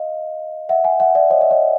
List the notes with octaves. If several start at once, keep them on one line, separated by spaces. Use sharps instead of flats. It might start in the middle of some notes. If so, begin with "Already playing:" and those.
Already playing: D#5 F5
E5 F#5
F#5 G#5
E5 F#5
D5 E5
C#5 D#5
E5
C#5 D#5